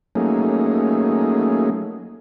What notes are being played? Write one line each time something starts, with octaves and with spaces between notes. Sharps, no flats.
F#3 A3 A#3 C#4 D#4 G#4